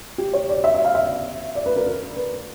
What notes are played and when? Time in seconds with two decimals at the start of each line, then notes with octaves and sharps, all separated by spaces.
0.18 G4
0.33 C#5
0.49 D5
0.64 E5
0.74 E5
0.85 F5
0.95 E5
1.55 D5
1.66 B4
1.76 A#4
1.86 A#4
2.17 B4